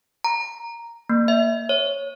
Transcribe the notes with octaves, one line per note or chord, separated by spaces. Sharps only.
A#5
A#3
E5
C#5